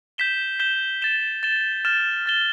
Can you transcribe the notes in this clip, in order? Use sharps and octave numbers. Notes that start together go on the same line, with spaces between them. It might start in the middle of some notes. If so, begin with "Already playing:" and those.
G6 B6 E7 G7
G6 B6 E7 G7
A6 E7 G7
A6 E7 G7
F6 A6 E7 G7
F6 A6 E7 G7